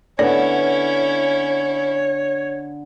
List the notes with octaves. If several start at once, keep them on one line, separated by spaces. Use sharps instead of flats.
D3 B3 C#4 E4 C#5 D5